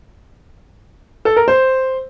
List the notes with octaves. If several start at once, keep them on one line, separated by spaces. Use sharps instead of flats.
A4
A#4
C5